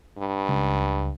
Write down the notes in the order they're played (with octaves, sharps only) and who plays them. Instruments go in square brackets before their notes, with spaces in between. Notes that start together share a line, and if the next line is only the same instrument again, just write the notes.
[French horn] G2
[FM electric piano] C#2